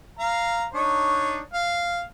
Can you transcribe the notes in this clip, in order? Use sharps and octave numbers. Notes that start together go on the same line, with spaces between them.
F5 A#5
D4 D#4 C#5
F5